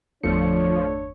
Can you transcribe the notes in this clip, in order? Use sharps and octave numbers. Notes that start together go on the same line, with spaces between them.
G1 E2 F3 A3 D4 C#5 C#7